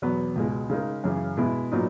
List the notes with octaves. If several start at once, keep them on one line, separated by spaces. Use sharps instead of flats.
E2 B2 F#3 B3
C#2 B2 G#3
C#3 G#3 D#4 A#4
F#2 C#3 E3
B2 G#3 B3 E4
A#2 F#3 B3 D#4